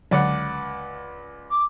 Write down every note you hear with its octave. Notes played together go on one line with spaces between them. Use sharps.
C#2 D3 F#3 D5 F#5
D6